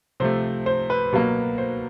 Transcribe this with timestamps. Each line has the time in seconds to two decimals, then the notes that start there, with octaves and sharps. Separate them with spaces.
0.20 C3 F3 A3 C5
0.66 C5
0.90 B4
1.12 B2 F#3 A#3
1.58 C5